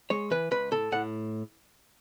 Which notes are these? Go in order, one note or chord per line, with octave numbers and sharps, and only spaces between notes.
G#3 C#5
E3 B4
C#2 B4
A2 A4
A2 F#5